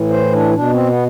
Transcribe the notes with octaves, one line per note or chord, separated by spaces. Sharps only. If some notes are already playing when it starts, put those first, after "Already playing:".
Already playing: A2 E3
C5
D4
B2 D4
C4
B3